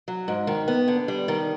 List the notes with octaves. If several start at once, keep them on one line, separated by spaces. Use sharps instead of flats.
F#3
G#2
D#3
B3
D3
G3
D#3